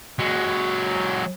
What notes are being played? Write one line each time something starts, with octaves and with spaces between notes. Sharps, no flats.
F#3 G#3